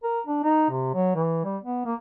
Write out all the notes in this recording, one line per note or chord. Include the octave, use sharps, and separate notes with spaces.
A#4
D4
D#4
C3
F#3
E3
G3
B3
A#3